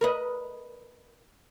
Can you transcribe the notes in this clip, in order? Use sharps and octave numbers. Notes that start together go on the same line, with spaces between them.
A#4 B4 D#5